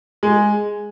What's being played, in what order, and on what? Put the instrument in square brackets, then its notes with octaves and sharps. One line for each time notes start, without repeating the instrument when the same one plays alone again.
[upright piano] G#3